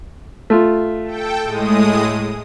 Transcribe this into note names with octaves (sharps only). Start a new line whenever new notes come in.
A3 F4
A4 G5
A2 G#3 D#6